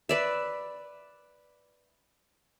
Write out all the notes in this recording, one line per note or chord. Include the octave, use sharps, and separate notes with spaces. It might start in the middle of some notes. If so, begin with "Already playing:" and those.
B4 D5 E5